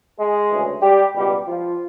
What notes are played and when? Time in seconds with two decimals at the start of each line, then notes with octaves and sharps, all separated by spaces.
0.17 G#3 G#4
0.50 D2 C#3 E3
0.81 G3 G4
1.14 C#2 B2 F#3 G3 G4
1.46 F3 F4